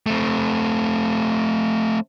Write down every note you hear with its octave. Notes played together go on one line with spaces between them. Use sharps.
A3 C4